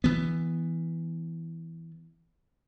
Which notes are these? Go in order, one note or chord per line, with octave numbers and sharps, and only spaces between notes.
E3 B3